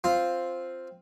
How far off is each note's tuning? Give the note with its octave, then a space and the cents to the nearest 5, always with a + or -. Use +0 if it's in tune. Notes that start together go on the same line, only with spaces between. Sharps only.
C4 +0 F4 +0